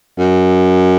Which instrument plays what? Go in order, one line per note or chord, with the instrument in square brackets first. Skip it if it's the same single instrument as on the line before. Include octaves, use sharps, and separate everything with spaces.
[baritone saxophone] F#2